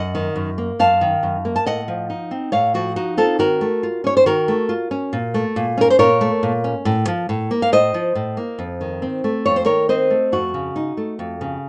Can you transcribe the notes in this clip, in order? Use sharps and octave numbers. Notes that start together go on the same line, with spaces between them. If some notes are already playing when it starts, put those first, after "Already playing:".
Already playing: F#2 D#5 F#5
D#3
F#2
A#3
F#2 F5 A5
D#3
F#2
A#3
A5
A2 D#5 F#5
F3
D#4
C4
A2 C#5 F5
F3 F#4
D#4 F#4
C4 F4 A4
D#3 F#4 A#4
A3
F4
C#4 C#5
C5
D#3 F#4 A#4
A3
F4
C#4
A#2
A3
A#2
C#4 A#4
C5
A#2 A#4 C#5
A3
A#2
C#4
A2
F3
A2
A#3
F5
A2 C5 D#5
F3
A2
A#3
F2
D#3
C4
A3
F2 C#5
C5
D#3 A#4 C#5
C4 C5 D#5
A3
F2 F#4
C#3
D#4
A3
F2
C#3